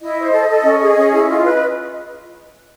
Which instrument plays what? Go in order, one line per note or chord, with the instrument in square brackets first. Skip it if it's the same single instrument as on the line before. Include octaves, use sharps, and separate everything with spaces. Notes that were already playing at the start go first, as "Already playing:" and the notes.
[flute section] E4 D#5
C5
A4
A4
C#4
G#4
C#4
E4
F4
B4